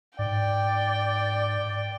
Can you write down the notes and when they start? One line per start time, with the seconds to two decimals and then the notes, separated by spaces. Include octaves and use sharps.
0.19 G#2 D5 G5